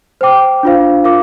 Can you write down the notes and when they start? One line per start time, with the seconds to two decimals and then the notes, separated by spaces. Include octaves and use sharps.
0.21 C5 G5 D6
0.63 D4 F4 C5 F5
1.04 F4 A#4 F5 D6